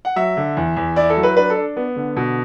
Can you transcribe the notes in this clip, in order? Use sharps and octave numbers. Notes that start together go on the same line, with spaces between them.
F#5
F#3 E5
D3
E2
E2
E4 D5
A4
F#3
B4
D4 B4
A4
D4
B3
D3
B2